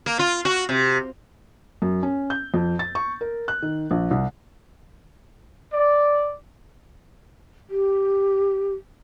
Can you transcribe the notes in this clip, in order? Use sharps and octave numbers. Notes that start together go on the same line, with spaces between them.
A#3
F4
F#4
C3
F#2
C#4
G6
F2
A6
C#6
A#4
F#6
D#3
A#1
C2
D5
G4